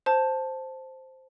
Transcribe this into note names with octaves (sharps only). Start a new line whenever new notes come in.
C5 A5